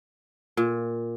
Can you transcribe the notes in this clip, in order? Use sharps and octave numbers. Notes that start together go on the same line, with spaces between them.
A#2